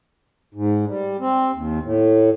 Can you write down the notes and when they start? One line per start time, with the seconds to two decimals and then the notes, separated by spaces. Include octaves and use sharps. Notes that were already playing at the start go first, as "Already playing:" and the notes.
0.55 G#2
0.88 G3
1.20 C4
1.54 D#2
1.84 A2